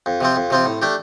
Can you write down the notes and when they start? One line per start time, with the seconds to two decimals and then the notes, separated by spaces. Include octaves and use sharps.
0.06 F2
0.21 C3 F3 C4 F4
0.36 F2
0.50 C3 F3 C4 F4
0.65 A2
0.82 A3 D4 G4